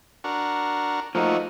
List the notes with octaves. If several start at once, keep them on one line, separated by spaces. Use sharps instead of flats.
D4 F#4 A#4
F3 A3 A#3 D#4 F#4